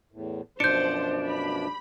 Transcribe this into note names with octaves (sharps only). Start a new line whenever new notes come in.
E2 A2
F#2 B2 F3 D4 C5 G6 C#7
B5